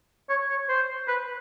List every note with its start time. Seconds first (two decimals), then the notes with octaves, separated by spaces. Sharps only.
0.29 C#5
0.49 C#5
0.69 C5
1.08 B4